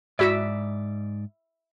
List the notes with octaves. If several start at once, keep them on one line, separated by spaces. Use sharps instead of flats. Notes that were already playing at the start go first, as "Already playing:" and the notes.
G#2 E4 F#4 D5 E5 D7